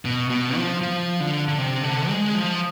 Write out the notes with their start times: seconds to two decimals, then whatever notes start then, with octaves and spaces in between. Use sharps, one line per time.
0.05 B2
0.30 B2
0.56 F3
0.81 F3
1.20 D3
1.48 D3
1.58 C3
1.84 D3
2.09 G#3
2.34 F3